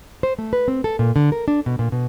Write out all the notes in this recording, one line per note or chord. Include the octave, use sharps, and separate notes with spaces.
C5
A3
B4
C4
A4
A#2
D3
A#4
D4
B2
A#2
B2